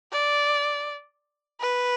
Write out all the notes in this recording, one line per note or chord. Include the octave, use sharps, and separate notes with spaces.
D5
B4